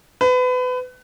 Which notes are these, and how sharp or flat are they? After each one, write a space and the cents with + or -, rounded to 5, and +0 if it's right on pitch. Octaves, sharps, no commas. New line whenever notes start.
B4 +30